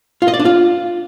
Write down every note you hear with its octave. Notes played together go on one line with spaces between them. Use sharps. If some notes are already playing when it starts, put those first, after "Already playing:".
F4
D#5
D5
D4
F4